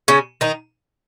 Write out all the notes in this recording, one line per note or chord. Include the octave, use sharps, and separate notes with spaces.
C#3 C#4
D#3 D#4